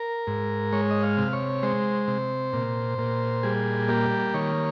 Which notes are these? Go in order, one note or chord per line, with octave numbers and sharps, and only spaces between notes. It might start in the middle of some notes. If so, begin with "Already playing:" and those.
Already playing: A#4
G#2
G#3 C#5
D#5
F5
C3
C#5
G#3 C5
C3
A#2
A#2
G3 G#4
A#3 G4
D#3 C#5